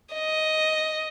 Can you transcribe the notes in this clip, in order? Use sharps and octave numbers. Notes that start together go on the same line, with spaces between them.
D#5